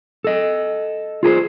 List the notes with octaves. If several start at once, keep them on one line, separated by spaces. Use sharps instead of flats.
A4 D#5
F4 G#4 A#4 C5